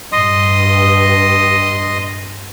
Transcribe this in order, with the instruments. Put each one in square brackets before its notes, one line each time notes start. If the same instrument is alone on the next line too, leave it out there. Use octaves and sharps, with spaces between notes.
[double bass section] G2 [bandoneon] D#5 C6 D#6